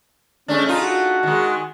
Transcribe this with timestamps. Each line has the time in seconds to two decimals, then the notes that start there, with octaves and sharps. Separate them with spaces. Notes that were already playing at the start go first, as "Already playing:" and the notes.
0.48 G#3 A3 C#4 D4
0.65 A3 D#4 F4
0.83 F#4
1.23 D#3 G#3